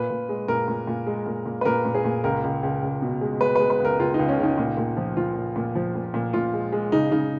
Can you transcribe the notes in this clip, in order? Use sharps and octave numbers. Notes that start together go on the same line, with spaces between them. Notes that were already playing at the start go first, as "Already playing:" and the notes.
Already playing: A#2 B4
A#2
G#3
A#2 A#4
A#2
A#2
G#3
A#2
A#2
B4
A#2 A#4
A#2
G#4
A#2
C#2 A#4
C#2
C#2
C#2
B2
G#3
G#3 B4
G#3 B4
B4
C#2 A#4
C#2 F4
D#4
C#2
C#4
C#2 D#4
A#2
A#2
F3
F3 F4
A#2
A#2
F3
A#2
A#2
A#2 F4
G#3
G#3
C#3 D#4
C#3 D#4